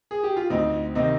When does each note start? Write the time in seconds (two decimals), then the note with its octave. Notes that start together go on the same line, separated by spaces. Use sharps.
0.11 G#4
0.23 G4
0.37 F4
0.50 D2 C4 D#4
0.95 C3 D#3 C4 D#4